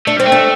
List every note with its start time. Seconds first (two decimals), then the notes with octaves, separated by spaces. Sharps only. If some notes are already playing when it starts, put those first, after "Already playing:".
0.07 A3 D4
0.17 G3 C4
0.26 A3
0.32 D4